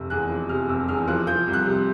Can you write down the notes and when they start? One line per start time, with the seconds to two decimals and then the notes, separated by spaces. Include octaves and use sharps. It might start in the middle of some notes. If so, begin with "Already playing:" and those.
Already playing: F1 C3 E6
0.10 E2 F#6
0.30 F3
0.49 C3 F6
0.69 F1 E6
0.88 E2 F6
1.08 F3 F#6
1.27 F3 G6
1.47 C2
1.53 F#6
1.66 C3